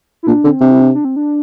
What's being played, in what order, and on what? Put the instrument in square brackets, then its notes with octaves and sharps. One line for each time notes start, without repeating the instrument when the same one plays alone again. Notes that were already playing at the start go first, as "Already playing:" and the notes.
[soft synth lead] E4
[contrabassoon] A#2 [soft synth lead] D4
[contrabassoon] D3 [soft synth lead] C4
[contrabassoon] C3 [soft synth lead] D4
[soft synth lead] E4
D4
D4
C4
D4